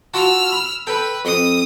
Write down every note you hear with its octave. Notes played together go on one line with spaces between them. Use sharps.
F4 F#4 A5 E6 F6
B5
A4 B4 G5
F2 D#6